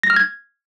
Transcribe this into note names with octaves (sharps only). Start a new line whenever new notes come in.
A#6
F6
G#6